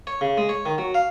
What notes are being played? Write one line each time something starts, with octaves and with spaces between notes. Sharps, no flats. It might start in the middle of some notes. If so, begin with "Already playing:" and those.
C#5
C#3
G#3
C#5
D#3
F#3
F5